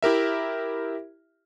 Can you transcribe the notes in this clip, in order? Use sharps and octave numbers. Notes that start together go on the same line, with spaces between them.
E4 G4 A#4 E5